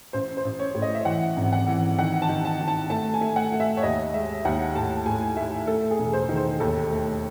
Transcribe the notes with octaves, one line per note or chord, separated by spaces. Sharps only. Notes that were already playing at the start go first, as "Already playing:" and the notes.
A1 C5
C5
A1
C#5
A2
D#5
E5
E3 F#5
G#1
F#5
E3
D#3 F#5
A5
D#3
A5
D#3
A5
A3 A5
G#5
A3
F#5
A3
E5
C#5
D#2 D#5
G#3 E5
D#2 F#5
A2 A5
A2 G#5
A2 E5
A3 A4
G#4
E1
C5
D#3
C5
D#2 A4
A3